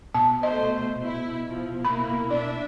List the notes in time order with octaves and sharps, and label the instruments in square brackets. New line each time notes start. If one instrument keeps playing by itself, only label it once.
[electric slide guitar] B2 [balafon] A5
[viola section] A3 C5 [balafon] D#5
[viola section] E4
F3
[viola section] A#3 E4 [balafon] B5
[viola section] D4 E5 [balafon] D5